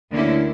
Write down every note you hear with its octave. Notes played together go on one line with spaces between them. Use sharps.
D2 D3 A#3 C#4 E4